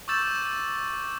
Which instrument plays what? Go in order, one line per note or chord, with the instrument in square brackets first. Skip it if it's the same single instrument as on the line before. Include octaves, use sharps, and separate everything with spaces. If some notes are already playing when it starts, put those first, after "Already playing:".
[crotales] C#6 D6 E6 G6 A6 E7